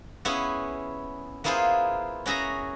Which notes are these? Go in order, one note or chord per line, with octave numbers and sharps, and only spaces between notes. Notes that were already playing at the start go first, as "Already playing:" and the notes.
B3 C#4 E4 G#4
A#3 B3 E4 F4 G#4 C5
C#4 F#4 G#4 E5 A#5